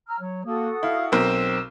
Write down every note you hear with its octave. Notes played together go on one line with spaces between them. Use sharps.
A#5 E6 F6
F#3 C#5
A#3 F#4 A4 D#6
E4 F5
B1 C4 A#4 E6